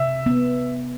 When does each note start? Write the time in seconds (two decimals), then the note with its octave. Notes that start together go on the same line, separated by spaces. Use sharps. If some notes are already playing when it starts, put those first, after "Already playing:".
Already playing: C3 E5
0.26 B3